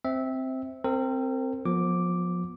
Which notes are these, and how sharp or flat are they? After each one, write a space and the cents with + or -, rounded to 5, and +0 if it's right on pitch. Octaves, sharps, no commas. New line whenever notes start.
C4 +0 E5 -15
C4 +0 A#4 -35
F3 +25 B3 -20 D6 +0